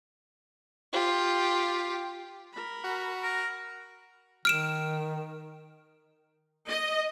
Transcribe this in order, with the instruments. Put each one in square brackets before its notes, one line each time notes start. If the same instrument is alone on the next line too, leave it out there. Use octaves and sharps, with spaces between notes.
[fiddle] F4 G4
[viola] A#4 B5
[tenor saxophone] F#4
[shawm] A#4
[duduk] D#3 [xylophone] F6 D7 E7
[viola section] D#5